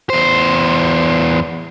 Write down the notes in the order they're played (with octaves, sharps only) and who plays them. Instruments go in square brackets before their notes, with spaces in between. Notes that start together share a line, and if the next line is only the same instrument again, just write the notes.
[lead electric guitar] E2 C5